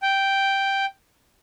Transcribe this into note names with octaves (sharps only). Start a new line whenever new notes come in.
G5